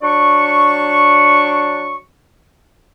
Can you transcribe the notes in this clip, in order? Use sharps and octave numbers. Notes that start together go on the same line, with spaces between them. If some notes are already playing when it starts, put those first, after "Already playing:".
F#3 D4 D5 C#6